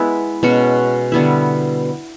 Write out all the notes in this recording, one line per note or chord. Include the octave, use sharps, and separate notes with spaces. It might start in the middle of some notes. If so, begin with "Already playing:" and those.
Already playing: G#3 B3 E4
B2 G#3 C#4 F#4
D3 G3 B3 E4